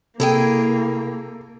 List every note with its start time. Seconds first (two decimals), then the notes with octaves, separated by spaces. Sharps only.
0.20 C3 A#3 E4 G#4 A4 G5